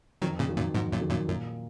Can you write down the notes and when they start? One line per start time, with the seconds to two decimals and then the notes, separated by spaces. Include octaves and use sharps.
0.22 F2 D#3 F#3
0.39 A#2 C#3
0.49 D#3 F#3
0.57 F#2 A#2
0.74 F2 G#2 B2
0.92 F#2 A#2
1.01 D#3 F#3
1.10 F#2 A#2
1.28 F#2 A#2